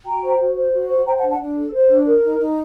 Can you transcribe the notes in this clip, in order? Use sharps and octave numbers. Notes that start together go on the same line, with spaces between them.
F#4 G5 A#5
C5
F#4
C5
F#4
C5
C5 G5 A#5
F#5 A5
D4
F#5 A5
D4
A4
C5
D4
A#4
D#4
D#4